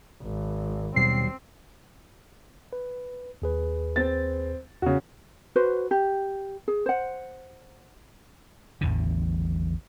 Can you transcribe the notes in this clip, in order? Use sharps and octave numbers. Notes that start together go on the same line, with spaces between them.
G#1
D#2 B2 F#3 G3 C4 C7
B4
D#2 G#4 B4
C4 A6
E2 C#3 F#4
F#4 B4 C5
G4
G#4
C5 F#5
A1 E2 D3